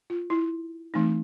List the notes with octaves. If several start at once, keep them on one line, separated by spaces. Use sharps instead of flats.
F4
E4
E3 A3 C4 D#4